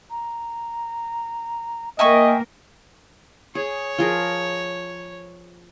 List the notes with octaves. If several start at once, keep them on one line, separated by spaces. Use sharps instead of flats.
A#5
A#3 A#4 D#5 E5 G5 G#5 C#6
G#4 C#5
F3 G#4 A#4